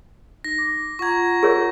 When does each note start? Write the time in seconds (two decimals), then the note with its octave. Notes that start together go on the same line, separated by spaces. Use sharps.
0.44 D#4 A#6
0.58 D6
0.99 F4 F#5 A#5 C#6 G#6
1.43 G#4 A#4 C#5 C#6